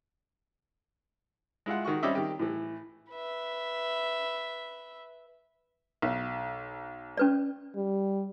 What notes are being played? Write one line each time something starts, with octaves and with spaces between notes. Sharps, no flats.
G#3 E4 F4 F#5
D#3 F#4 C#6
G3 C4 C#4 D#5 E5 D6
D#3 G4
A2 E3
B4 E5
B1
C#4 B4 D5
G3